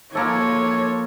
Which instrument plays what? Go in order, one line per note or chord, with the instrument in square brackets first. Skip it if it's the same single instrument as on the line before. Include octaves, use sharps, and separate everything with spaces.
[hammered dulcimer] F3 A#3 A4 [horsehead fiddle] C#5